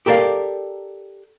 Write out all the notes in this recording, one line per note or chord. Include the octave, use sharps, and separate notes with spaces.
G4 A4 A#4 D5 F5